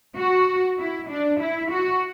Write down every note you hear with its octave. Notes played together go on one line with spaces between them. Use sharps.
F#4
E4
D4
E4
F#4